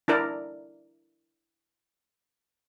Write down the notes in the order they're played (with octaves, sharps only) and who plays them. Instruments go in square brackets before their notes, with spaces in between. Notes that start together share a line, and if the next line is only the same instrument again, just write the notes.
[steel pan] D4 E4 A#4 D5